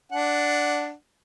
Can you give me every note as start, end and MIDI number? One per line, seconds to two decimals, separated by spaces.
0.12 0.92 62
0.12 0.92 78